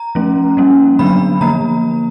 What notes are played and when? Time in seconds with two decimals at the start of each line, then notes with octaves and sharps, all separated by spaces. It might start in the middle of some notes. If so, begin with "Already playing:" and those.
Already playing: A#5
0.15 F3 A3 C#4
0.57 G3 A#3 C#4
0.99 D3 F#3 B3 D4 B5
1.41 D3 F3 A#3 A#5